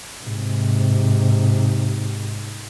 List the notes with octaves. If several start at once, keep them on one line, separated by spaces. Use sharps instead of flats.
G#2 C3